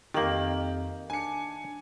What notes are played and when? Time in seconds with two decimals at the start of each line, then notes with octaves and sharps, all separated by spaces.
0.14 F2 D#3 A#3 G4 F#7
1.10 D4 G#5 C#7